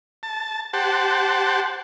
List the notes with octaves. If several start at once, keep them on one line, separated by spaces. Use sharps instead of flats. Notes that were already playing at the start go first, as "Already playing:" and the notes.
A5
G4 C5 F#5 A5